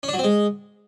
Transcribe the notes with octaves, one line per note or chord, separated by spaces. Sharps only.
C#4
D4
F#3
C4
G#3